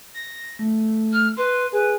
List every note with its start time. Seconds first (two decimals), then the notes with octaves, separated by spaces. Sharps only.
0.14 A#6
0.59 A3
1.12 F6
1.37 B4 C6
1.73 G#4 B4